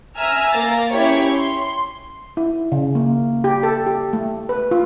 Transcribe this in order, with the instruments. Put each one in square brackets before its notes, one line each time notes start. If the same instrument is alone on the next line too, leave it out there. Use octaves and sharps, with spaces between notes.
[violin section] E5 G#5 A#5 E6 F6
A#3 A#5 A6
C#4 E4 G4 C#5
C6
[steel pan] E4
C#3
A#3
G4
A4
G4
A3
B4
F4